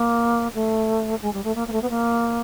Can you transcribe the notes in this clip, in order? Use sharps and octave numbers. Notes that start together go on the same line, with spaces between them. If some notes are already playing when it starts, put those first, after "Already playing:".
Already playing: A#3
A3
G#3
G3
A3
A#3
A#3
A3
B3
A#3